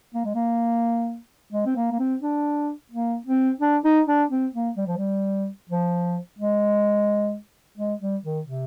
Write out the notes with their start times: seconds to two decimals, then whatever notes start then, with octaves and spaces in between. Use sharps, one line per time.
0.14 A#3
0.25 G#3
0.35 A#3
1.53 G#3
1.66 C4
1.76 A#3
1.92 A#3
1.99 C4
2.23 D4
2.92 A#3
3.26 C4
3.61 D4
3.84 D#4
4.07 D4
4.31 C4
4.54 A#3
4.77 G3
4.87 F3
4.97 G3
5.69 F3
6.39 G#3
7.78 G#3
8.01 G3
8.24 D#3
8.47 C3